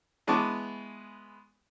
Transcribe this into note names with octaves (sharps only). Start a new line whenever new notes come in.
E3 G#3 B3 A5 C#6 D6